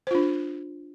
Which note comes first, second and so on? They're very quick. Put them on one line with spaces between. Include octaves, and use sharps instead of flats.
C5 F4 D4